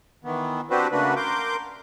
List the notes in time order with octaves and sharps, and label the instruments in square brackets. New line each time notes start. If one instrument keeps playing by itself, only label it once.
[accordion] D#3 E3 B3
C4 D4 F#4 G4 B4 C5
C#3 A3 A#3 D4 F#4 B4
A#4 C6 D6 G6